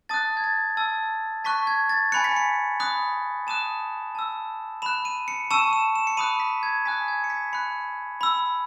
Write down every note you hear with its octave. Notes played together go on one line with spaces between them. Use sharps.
A5 D#6 F#6 A6
G#6
A6
A5 E6
A5 C#6 F#6 B6
G#6
A6
G#5 B5 F#6 C#7
B6
C#7
B5 D#6 F#6
A5 D#6 F#6 E7
A5 E6
B5 F#6 E7
D#7
C#7
A5 C#6 E6 E7
E7
E7
C#7
B5 D#6 F#6 D#7
B6
G#6
G#5 D#6 F#6 B6
G#6
C#7
B6
B5 F#6 C#7
B5 E6